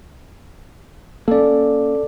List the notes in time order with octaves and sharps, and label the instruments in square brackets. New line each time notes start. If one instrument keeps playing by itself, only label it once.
[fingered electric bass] A#3 C#4 [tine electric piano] A4 D5